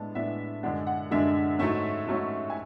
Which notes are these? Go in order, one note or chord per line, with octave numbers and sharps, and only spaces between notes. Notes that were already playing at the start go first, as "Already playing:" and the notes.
Already playing: A2 G#3 B3 D4 A5
A2 G#3 B3 D4 E5
F#2 D3 G#3 D4 F#5
F#5
F#2 D3 G#3 D4 E5
G#2 F#3 A3 C#4 E5
G#2 F#3 A3 C#4
G#5